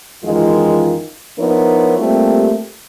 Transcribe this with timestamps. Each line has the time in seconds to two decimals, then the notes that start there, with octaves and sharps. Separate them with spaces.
0.23 F#2 D#3 E3 G#3 F4
1.38 F3 B3 D#4 E4 A#4 C#5
1.98 G3 A3 A#3 C4 F4 G4